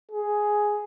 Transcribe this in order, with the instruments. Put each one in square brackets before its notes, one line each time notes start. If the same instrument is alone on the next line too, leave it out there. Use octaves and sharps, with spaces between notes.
[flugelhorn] G#4